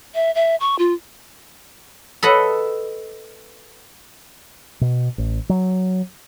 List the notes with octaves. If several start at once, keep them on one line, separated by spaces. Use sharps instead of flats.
E5
E5
C#6
F4
A4 B4 D#5 F#5
B2
A1
F#3